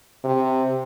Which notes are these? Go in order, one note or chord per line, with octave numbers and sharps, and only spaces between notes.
C3